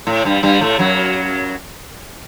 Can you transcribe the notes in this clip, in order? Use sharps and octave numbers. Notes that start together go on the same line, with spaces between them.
A2
G2 G3
G2 G3
A2 A3
F#2 F#3